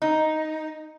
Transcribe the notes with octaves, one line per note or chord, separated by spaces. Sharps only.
D#4